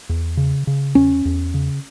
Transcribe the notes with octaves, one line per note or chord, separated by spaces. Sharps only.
E2
C#3
C#3
E2 C#4
E2
C#3